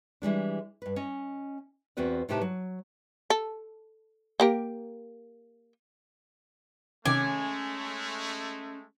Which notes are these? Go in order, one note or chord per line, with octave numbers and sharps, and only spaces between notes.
E3 G3 G#3 D4
G2 B4
C#4 D#5 G#5
E2 C4 F#4 B4 D5
A2 C3 D#4 G4 B4 A5
F#3
A4
A#3 G4 A#4
C3 D#3 G#3 A3 C#4 G#5 D6